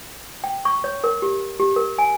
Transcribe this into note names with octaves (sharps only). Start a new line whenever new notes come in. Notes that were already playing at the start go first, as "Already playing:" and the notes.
G5
C#6
C#5
A#4
G4
G4
A#4
G#5